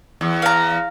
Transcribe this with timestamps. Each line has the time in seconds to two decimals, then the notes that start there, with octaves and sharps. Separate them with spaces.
0.21 E2
0.42 F5 A#5